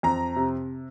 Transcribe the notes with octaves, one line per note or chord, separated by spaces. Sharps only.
F2 A#5
C3